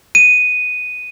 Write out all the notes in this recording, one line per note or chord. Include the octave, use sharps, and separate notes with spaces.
D#7